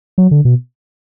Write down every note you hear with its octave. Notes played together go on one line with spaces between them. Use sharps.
F#3
D3
B2